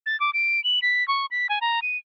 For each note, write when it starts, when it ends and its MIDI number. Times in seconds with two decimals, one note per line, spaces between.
0.06 0.19 93
0.20 0.30 86
0.34 0.63 98
0.64 0.80 102
0.82 1.06 95
1.08 1.26 85
1.31 1.47 95
1.49 1.59 80
1.61 1.80 82
1.82 1.97 99